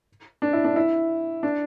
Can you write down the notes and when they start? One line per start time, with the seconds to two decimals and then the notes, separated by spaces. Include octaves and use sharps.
0.42 D4
0.53 E4
0.65 D4
0.76 E4
1.43 D4